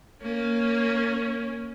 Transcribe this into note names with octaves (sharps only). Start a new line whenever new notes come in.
A#3 C#4